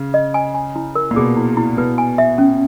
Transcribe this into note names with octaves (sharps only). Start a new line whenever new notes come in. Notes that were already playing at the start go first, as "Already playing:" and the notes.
Already playing: C#3
D#5
G#5
G#5
E4
A#4
A#2
B2 G#4
E4
E4
B2 B4
G#5
E5
C#4